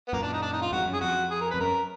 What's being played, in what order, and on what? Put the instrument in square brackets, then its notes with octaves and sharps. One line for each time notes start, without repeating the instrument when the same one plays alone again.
[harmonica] B3
[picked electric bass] F#2 A#2 [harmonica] A#3
[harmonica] D4
D#4
D4
D#4
F4
[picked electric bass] F2 G#2 [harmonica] F#4
[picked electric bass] F#2
[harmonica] G#4
[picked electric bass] F2 [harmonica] F#4
[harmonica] G#4
A#4
B4
[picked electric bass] F2
[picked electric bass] F#2 [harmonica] A#4